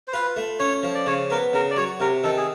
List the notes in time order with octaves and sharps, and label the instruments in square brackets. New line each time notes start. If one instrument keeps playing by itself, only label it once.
[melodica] C5
[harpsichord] F4 [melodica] B4
[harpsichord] A3
[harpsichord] C#4 [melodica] C#5
[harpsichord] F3
[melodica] D5
[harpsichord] C#3 [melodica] C#5
[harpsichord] B3 [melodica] A#4
[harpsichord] C#3 [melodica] A#4
[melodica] D5
[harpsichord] F#3 [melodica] C#5
[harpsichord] C3 [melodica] A#4
[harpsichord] D#3 [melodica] A4
[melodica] G#4